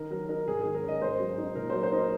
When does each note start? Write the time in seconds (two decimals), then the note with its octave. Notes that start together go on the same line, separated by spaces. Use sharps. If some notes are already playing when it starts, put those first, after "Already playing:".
Already playing: D#3 D#4 A#4
0.10 F#3 A#4
0.29 D#4 A#4
0.47 G#2 G#4
0.61 D#3 G#4
0.75 A#4
0.83 C#4
0.88 D#5
1.01 G#2 C5
1.19 F#3
1.38 D#4
1.55 A#2 A#4
1.70 F#3 C5
1.83 C5
1.92 D#4
1.97 A#4